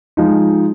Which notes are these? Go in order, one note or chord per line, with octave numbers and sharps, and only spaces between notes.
F3 G#3 D#4